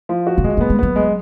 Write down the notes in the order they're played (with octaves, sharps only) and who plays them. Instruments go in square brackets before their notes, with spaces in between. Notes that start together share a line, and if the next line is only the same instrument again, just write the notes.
[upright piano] F3
F#4
[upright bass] D3
[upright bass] F3 [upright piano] G#3
[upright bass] F#3
[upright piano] B3
[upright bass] G#3
[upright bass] F#3 [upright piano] B3
[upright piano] G#3